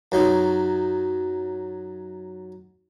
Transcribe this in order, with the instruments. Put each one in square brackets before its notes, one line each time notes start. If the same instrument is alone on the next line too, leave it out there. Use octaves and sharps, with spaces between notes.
[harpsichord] F#2 F#3 D#4